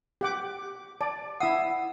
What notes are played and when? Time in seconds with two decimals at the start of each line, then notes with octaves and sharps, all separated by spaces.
0.21 G4 F#5 D6
1.01 D5 A5
1.40 E4 E5 F#5 D#6